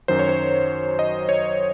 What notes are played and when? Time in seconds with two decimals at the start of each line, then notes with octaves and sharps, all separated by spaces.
0.08 F#2 D#3 F#3 C5
0.19 C#5
0.29 C5
0.99 D#5
1.29 C#5